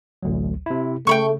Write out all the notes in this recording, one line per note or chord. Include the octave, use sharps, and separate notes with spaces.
A1 D2 F#3
C3 E4
C#3 A3 G5 B5 C#6